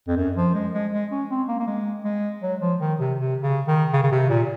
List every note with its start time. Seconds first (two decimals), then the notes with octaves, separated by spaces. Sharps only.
0.08 F2
0.17 F#2
0.36 F3
0.54 G#3
0.74 G#3
0.92 G#3
1.11 C#4
1.30 C4
1.48 A#3
1.60 A#3
1.67 G#3
2.04 G#3
2.42 F#3
2.60 F3
2.80 D#3
2.99 C3
3.18 C3
3.43 C#3
3.67 D#3
3.93 C#3
4.03 C#3
4.11 C3
4.29 A#2